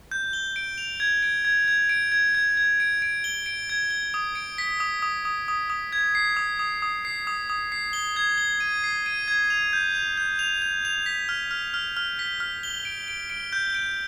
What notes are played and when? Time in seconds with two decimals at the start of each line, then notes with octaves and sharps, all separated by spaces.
0.11 G6
0.33 G7
0.56 D7
0.78 F7
1.00 G#6
1.23 D7
1.45 G#6
1.68 G#6
1.89 D7
2.12 G#6
2.35 G#6
2.57 G#6
2.80 D7
3.02 D7
3.24 G7
3.46 D7
3.69 G#6
3.91 G7
4.14 D#6
4.35 D7
4.58 B6
4.80 D#6
5.02 D#6
5.25 D#6
5.48 D#6
5.70 D#6
5.92 G#6
6.15 C7
6.37 D#6
6.59 D#6
6.82 D#6
7.05 C7
7.27 D#6
7.50 D#6
7.72 C7
7.93 G7
8.16 G#6
8.38 G7
8.60 D#7
8.84 C7
9.06 D#7
9.28 G#6
9.50 F7
9.73 G6
9.95 F7
10.17 G6
10.39 F7
10.62 G6
10.85 F7
11.06 B6
11.29 F6
11.51 F6
11.74 F6
11.97 F6
12.19 B6
12.40 F6
12.63 G7
12.85 D7
13.08 D7
13.30 D7
13.53 G6
13.74 D7